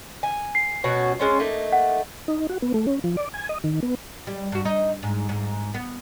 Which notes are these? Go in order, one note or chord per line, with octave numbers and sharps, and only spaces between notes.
G#5
C7
B2 C#4 F#4
G#3 C#4 F4
A3 A#3 D#4
F#5
D#4
F#4
B3
A3
C#4
F3
D5
G#5
D#5
D#3
B3
G3
G2 F#4
D#4
G#2
G#2
B3